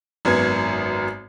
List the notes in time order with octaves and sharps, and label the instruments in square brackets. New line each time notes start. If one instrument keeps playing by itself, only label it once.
[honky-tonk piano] G#1 F#2 B3 G#6